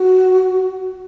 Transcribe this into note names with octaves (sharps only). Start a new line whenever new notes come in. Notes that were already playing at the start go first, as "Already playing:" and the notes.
Already playing: F#4